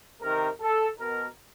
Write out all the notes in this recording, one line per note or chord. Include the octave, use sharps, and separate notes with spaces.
C3 D#3 A#4
A4
B2 A#4